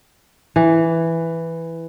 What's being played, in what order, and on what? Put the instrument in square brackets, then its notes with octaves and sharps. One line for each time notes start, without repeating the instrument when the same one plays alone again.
[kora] E3